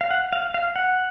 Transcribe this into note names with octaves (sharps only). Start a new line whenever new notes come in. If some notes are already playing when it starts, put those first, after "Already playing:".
F5
F#5
F5
F5
F#5